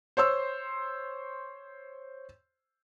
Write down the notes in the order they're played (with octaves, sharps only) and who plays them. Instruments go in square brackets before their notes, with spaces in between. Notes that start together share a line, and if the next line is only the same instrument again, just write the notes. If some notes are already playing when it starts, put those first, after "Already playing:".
[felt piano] C5 C#5 C6 E6